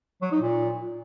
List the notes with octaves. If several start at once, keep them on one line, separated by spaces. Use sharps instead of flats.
F#3
D#4
A#2